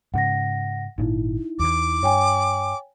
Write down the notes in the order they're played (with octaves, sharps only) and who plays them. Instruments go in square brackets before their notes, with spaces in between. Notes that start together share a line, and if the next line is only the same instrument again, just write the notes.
[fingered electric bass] G#2 C#3 [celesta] F#5 A#6
[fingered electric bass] G#1 A#2 [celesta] D#4 E4
[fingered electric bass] E2 E3 [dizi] D6
[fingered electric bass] G2 [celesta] C#5 G5 G#5